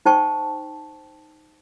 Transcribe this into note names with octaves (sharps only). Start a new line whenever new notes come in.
D#4 C5 G5 A5 C#6